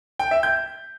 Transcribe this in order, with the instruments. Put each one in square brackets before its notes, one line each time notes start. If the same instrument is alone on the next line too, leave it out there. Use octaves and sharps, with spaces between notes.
[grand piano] G5
E5
G6